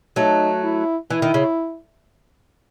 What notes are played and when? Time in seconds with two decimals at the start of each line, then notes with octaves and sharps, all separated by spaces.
0.16 F#3 A3 D#4
0.64 E4
1.10 E3 E4
1.22 D#3
1.34 C#3